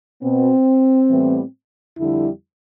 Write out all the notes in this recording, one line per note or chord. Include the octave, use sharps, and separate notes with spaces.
B2 B3 C4
A2 E3 G3 B3
F2 D3 G3 E4